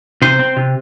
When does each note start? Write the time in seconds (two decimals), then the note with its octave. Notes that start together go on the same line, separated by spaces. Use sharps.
0.22 C3 C5
0.39 C4
0.57 C3